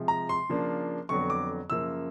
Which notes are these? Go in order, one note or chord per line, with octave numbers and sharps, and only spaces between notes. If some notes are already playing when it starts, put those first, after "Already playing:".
Already playing: C3 F3 G#3
A#5
C6
C#3 F3 A#3 D4
F2 D3 F#3 B3 C#6
D6
F#2 C#3 F3 A#3 E6